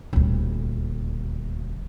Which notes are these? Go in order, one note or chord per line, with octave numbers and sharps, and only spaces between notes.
D#1 D2